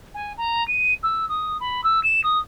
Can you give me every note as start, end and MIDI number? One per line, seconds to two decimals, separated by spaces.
0.14 0.32 80
0.37 0.66 82
0.67 0.94 99
1.03 1.27 88
1.28 1.57 87
1.60 1.83 83
1.83 2.02 88
2.03 2.21 100
2.23 2.38 87